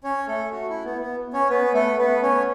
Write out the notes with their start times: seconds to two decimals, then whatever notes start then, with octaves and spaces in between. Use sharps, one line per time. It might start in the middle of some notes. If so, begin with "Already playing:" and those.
0.04 C#4 C#5
0.27 A3 A4
0.52 F#4
0.69 E4
0.85 B3
1.01 B3
1.33 C#4 C#5
1.49 B3 B4
1.74 A3 A4
1.98 B3 B4
2.22 C#4 C#5